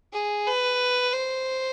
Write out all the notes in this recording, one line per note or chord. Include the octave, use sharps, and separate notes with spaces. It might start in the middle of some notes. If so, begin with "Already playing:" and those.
G#4
B4
C5